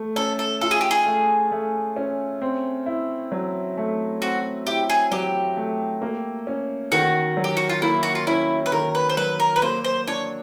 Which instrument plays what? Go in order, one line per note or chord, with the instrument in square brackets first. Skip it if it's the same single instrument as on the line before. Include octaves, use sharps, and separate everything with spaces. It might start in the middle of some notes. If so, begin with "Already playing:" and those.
Already playing: [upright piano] A3
[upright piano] C#4 [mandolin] A4
[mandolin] A4
[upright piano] F4 [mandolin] A4
[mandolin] G#4
G4
G#4
[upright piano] A3
A3
C#4
C4
E4
F#3
A3
[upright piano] C4 [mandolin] F#4
[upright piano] E4 [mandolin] G4
[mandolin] G#4
[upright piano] F#3 [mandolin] G4
[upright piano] A3
A#3
C#4
[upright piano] D#3 [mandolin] F#4
[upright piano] F#3
[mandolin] G4
F#4
F4
[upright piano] A#3 [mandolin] E4
[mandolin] F#4
F4
[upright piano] C#4 [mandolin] E4
[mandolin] B4
[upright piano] D#3 [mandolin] A#4
[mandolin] B4
C5
[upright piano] F#3 [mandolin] B4
[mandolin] A#4
B4
[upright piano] A#3 [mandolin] C5
[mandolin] C5
[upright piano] D4 [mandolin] C#5